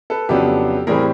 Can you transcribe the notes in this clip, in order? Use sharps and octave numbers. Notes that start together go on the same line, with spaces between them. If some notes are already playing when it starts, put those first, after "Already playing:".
A4 B4
F2 C#3 F#3 B3 D4 G4 A4
A2 E3 G3 C4 G#4 A#4